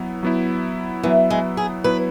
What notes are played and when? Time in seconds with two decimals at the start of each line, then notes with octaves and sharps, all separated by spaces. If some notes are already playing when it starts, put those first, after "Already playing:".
Already playing: F#3 B3 E4
0.23 F#3 B3 E4
1.03 E3 F#3 B3 E4
1.30 G#3
1.57 G#4
1.84 F#3 B3 E4 B4